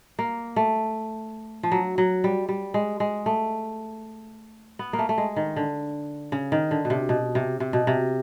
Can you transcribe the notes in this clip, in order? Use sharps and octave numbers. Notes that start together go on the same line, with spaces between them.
A#3
A3
F3
F#3
F#3
G3
G3
G#3
G#3
A3
B3
A#3
A3
A3
G#3
D#3
D3
C#3
D#3
D3
B2
C3
B2
C3
C3
B2
C3